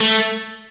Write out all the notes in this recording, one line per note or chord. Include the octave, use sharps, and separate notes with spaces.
A3